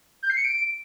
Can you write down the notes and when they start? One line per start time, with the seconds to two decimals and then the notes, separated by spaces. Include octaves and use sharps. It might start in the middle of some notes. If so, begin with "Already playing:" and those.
0.23 G6
0.30 C7
0.37 C#7
0.44 D7